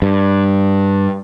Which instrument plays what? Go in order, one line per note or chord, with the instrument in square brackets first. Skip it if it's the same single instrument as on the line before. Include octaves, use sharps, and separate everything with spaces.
[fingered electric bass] G2